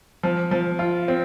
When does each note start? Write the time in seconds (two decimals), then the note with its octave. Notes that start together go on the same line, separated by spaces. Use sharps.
0.23 F3
0.51 F3
0.79 F4
1.08 C4